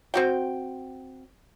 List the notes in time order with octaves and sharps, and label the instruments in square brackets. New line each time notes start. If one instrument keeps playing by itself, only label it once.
[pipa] C4 F#4 G5